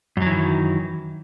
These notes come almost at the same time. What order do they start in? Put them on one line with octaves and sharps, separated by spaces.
F#2 F#3 E3 D#3